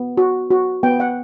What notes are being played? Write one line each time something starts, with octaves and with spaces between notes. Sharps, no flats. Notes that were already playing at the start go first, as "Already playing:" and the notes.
Already playing: B3
F#4
F#4
B3 G5
F#5